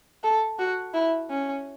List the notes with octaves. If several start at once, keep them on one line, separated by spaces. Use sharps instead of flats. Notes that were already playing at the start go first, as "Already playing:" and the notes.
A4
F#4
E4
C#4